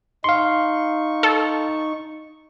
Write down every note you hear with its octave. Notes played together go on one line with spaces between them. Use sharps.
D#4 F5 C6 C#6
A4